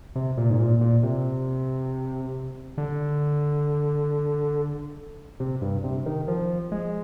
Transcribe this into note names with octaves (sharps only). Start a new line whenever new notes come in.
C3
A#2
G#2
A#2
A#2
C3
D3
C3
G2
C3
D#3
F3
G#3